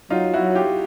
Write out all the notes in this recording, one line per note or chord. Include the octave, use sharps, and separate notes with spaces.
F#3 D#4 F4
E4 F#4
F#3
F4 G4